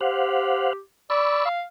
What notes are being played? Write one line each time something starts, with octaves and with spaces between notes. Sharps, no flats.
G4 C5 F5 F#5
D5 B5 C#6 E6
F5